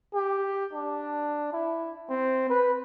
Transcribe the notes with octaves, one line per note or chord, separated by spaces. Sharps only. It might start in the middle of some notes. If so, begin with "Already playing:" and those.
G4
D4
E4
C4
B4